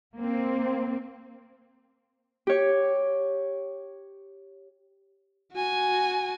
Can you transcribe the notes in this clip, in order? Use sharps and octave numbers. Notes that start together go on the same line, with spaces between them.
A#3 C4
G4 C#5
F#4 G#5